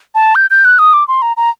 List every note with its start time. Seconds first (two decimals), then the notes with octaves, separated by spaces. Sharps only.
0.15 A5
0.35 G6
0.50 G6
0.65 F#6
0.79 D#6
0.93 D6
1.08 C6
1.22 A#5
1.37 A#5